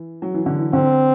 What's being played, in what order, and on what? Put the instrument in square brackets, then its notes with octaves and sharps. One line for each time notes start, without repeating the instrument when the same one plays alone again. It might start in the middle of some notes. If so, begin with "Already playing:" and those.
Already playing: [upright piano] E3
F#3
E3
D3
E3
[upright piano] D3 [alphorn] C4